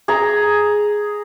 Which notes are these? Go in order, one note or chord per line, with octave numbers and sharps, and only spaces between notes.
G#4 A#5